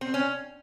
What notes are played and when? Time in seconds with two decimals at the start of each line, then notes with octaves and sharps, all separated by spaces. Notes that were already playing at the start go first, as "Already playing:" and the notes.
0.01 C4
0.14 C#4